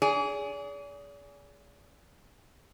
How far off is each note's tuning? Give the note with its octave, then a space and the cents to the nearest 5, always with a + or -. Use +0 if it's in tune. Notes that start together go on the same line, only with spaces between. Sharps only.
G#4 +0 D5 -45